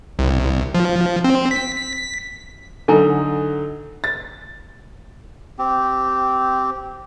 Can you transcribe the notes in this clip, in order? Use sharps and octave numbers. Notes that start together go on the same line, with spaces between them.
C2
F3
C4
B6
D3 F#3 D#4 A4 G#5 A#5
A6
C4 G4